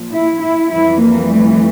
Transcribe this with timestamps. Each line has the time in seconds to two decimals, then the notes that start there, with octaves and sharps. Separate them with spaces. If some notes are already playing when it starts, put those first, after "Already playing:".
Already playing: A#2 F3
0.13 E4
0.42 E4
0.72 F2 E3 G3 E4
1.02 A#3
1.32 A3